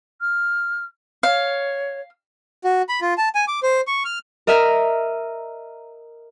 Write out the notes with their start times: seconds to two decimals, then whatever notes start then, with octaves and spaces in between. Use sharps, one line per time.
0.20 F6
1.23 C#5 F5
2.64 F#4
2.89 B5
3.01 F4
3.18 A5
3.35 G#5
3.48 D6
3.63 C5
3.87 C#6
4.05 F6
4.47 A#4 D#5 E5 A#5 F6